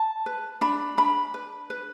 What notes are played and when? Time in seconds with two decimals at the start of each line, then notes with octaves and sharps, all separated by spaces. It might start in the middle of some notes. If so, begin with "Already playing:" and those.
Already playing: A5
0.26 B4
0.61 D4 B5
0.98 D4 B5
1.34 B4
1.70 B4